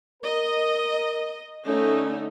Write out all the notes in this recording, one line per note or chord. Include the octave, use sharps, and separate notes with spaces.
A#4 D#5
D3 A3 C#4 D#4